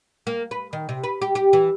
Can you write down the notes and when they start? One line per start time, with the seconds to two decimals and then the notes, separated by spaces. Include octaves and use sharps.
0.27 A#3
0.51 B4
0.73 D#3
0.89 C3
1.04 B4
1.22 G4
1.35 G4
1.53 E3